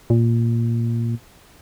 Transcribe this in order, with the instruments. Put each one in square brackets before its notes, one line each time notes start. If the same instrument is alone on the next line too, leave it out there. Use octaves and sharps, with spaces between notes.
[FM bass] A#2